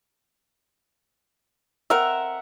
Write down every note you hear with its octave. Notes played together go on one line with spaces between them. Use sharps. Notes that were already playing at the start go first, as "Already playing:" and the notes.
C4 A#4 E5 F#5